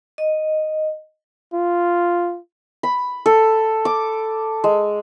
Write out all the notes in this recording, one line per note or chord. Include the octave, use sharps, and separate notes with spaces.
D#5
F4
B5
A4
D6
G#3